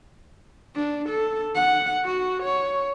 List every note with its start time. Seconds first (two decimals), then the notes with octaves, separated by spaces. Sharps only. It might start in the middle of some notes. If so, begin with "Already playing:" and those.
0.75 D4
1.09 A4
1.55 F#5
2.05 F#4
2.43 C#5